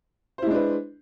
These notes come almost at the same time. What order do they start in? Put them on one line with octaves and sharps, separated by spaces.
C5 E4 G#3 D4 B4